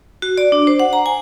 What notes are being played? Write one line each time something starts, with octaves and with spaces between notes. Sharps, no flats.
F#4
D5
D4
C5
F#5
A#5
G#5